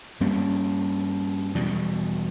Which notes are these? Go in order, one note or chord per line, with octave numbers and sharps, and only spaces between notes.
G2 G3 A#3 C#4
E2 B2 G3